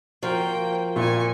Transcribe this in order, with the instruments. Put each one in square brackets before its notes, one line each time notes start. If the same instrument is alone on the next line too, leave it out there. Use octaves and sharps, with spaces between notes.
[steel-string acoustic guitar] F3 [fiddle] A#3 G5 [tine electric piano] F#4 A#4 C5
[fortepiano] A#2 [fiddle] G#5 C#6